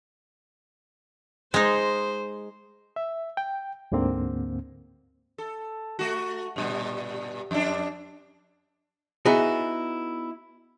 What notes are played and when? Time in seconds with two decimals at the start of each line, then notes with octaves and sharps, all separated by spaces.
1.54 G#3 D#4 C5
2.96 E5
3.37 G5
3.92 D2 G#2 D3 A#3 C4
5.38 A4
5.99 A3 F#4
6.56 G2 A#2 G3
7.51 F2 D4
9.25 B3 D#4 E4 F#4 G#4